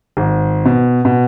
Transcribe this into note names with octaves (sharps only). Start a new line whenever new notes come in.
G#1
B2
B2